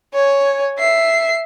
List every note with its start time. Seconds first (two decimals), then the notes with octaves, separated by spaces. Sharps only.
0.14 C#5 G#5
0.79 E5 C7